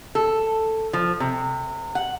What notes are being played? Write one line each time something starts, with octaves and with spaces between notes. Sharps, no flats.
A4
F3
C3
F#5